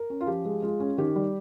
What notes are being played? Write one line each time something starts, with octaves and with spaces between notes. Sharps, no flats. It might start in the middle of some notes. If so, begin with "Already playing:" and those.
Already playing: A#4
C#4
F4
F3 G4
G#3
G#3 F4
C#4
D#3 G4
G3